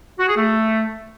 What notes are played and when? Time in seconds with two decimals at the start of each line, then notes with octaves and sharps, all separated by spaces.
0.19 F#4
0.28 G#4
0.36 A3